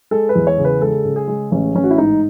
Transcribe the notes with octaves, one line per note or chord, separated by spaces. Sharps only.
G#3 A4
B4
E2
C#5
C#3
B4
G#3 A4
C#3
G#4
G#3
A1 C#4
A1 C#4
F#4
E4
G#2 D#4